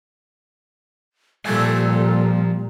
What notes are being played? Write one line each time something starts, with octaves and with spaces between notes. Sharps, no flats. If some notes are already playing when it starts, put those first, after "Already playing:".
A#2 F3 G3 A4 G#5